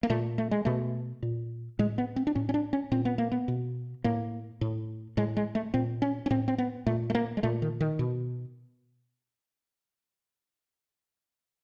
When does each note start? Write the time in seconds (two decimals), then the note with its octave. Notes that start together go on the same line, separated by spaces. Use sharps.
0.03 A#3
0.10 A#2 A3
0.38 A3
0.51 G#3
0.65 B2 A3
1.23 A#2
1.79 A2 G#3
1.98 B3
2.16 C4
2.27 D4
2.35 A2 C#4
2.49 C#4
2.54 D4
2.73 C#4
2.91 A#2 C4
3.05 B3
3.18 A#3
3.32 B3
3.48 B2
4.04 A2 A#3
4.61 A2
5.17 A2 G#3
5.37 G#3
5.55 A3
5.74 A#2 C4
6.02 C#4
6.26 C#4
6.30 A2 C4
6.48 C4
6.58 B3
6.86 A#2 A3
7.10 A3
7.15 A#3
7.37 G#3
7.43 A#2 A3
7.62 D#3
7.81 D#3
7.99 B2